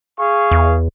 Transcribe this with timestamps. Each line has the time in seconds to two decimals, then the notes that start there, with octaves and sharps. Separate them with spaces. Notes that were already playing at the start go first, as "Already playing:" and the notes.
0.18 G#4 F5 C#6
0.51 E2